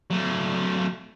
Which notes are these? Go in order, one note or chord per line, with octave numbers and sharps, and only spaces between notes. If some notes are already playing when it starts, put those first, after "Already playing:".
F#3 A3